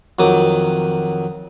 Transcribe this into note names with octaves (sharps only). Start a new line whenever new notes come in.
F2 D#3 F#3 D6 D#6